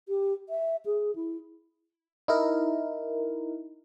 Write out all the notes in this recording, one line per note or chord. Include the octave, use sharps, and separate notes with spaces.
G4
E5
G#4
E4
D#4 E4 A#4